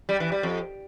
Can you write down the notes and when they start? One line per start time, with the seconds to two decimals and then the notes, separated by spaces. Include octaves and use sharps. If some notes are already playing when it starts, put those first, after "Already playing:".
0.09 G3
0.20 E3
0.32 G3
0.43 F2